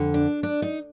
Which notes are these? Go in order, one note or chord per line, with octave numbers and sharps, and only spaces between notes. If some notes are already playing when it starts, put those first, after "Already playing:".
Already playing: F2 D3
D4
D4
D#4